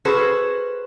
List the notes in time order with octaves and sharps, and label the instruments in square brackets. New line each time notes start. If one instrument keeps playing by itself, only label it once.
[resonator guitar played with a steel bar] C#4 F#4 G#4 A4 B4 C5